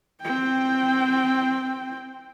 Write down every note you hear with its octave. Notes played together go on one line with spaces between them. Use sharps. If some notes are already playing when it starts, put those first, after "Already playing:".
C4 G5